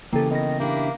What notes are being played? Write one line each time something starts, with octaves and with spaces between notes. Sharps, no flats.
C#3 E3 A#3 G4 A4
D#3 B3 A#6
A#3 D4 E4 G4